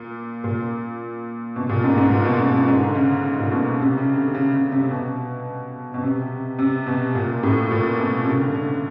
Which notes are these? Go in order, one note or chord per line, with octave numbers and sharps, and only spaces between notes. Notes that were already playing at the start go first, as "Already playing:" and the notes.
Already playing: A#2
A#2
B2
A#2
G#2
G#2
A#2
B2
G#2
G#2
G#2
D3
C#3
A#2
B2
C3
C#3
D3
C#3
C#3
C3
B2
B2
C3
C3
B2
A#2
A2
A#2
B2
C3
C#3
D3
D3